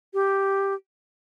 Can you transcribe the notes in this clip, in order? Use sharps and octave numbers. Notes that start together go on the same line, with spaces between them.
G4